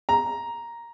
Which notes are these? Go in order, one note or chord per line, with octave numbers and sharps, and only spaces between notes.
A#5